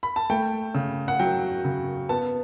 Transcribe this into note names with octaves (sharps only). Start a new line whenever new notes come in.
B5
A5
A3 G5
C#3
F#5
F#3 G5
C#3
B3 A5